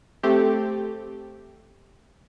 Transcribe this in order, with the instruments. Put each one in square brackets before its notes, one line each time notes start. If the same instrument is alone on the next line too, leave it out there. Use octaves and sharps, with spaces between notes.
[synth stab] A3 C4 G4